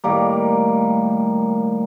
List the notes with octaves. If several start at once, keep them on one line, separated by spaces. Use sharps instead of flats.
A2 D#3 G3 A#3